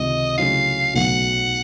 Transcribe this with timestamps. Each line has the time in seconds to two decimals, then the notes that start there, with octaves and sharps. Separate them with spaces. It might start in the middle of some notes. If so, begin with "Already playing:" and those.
Already playing: C#2 C3 D#3 D#5
0.38 C#3 F#3 A3 C#4 E4 F5
0.94 B1 B2 F#3 A3 F#5